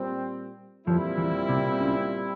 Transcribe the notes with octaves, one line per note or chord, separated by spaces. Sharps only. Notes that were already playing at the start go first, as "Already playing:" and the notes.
Already playing: A#2 G3 C4
F2 A#2 F3 G3 C4 E4
E2 E3
C2 C3
C#2 C#3